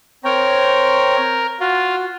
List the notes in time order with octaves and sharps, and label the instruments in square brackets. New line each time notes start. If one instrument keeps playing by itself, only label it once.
[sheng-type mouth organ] C4 C#5 G5 [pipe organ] A#4
[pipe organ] F4 [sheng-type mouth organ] F#4